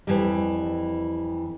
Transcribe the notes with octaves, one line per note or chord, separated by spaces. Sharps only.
F2 E3 G3